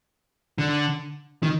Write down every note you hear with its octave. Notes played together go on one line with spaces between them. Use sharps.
D3
D#3